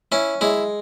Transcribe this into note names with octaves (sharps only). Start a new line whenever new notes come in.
C#4 E4
G#3 E4